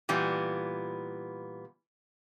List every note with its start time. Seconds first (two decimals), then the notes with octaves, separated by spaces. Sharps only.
0.09 A#2 E3 G3 B3